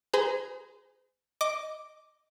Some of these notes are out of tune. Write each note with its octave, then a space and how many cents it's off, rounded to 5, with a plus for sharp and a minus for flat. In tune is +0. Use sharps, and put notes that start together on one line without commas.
G#4 +0 C5 -40 A#5 +15
D#5 +0 D6 +0